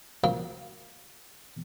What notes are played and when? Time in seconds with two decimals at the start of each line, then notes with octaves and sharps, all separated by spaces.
0.24 F3 F#3 A#3